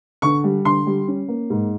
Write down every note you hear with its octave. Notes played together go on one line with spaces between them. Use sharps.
D3 C#6
G3
D3 C6
G3
C#4
A#3
G#2